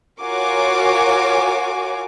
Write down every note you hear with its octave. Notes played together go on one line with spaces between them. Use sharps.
F4 F#4 A#4 C#5 G#5 D6